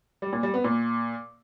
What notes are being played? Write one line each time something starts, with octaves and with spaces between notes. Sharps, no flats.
G3
A#2
G3
B3
A#2